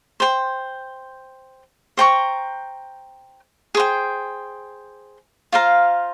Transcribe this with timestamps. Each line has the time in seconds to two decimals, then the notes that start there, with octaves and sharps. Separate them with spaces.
0.20 C5 G5 C6
1.97 C5 G5 A#5 C#6
3.75 G#4 C5 G5
5.52 F4 C5 F5 A#5